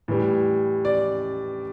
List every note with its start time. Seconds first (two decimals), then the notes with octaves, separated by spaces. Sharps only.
0.08 A2 E3 G3
0.85 D5